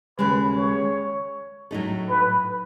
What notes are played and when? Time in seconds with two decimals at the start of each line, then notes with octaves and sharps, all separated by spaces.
0.19 D#2 C#3 G#3 B4
0.57 C#5
1.71 A2 F#3 A3 D#4 A4
2.09 B4